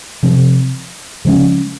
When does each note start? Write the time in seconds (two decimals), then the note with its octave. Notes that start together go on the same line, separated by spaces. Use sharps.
0.23 C3 F3 C4
1.25 C#3 F3 G#3 C#4